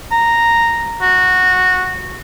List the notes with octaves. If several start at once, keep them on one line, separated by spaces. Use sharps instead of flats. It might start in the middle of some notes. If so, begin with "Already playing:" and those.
A#5
F#4